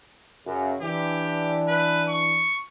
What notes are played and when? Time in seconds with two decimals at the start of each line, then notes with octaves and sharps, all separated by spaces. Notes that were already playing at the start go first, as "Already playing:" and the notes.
0.46 F#2 C#3
0.82 E3 D4 G4
1.68 B4
2.08 C#6